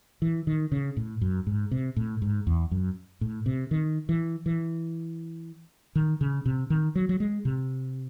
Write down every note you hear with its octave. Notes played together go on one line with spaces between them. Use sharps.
E3
D#3
C#3
A2
F#2
G#2
C3
A2
G#2
E2
F#2
A2
C3
D#3
E3
E3
D#3
C#3
C3
D#3
F#3
F#3
G#3
C3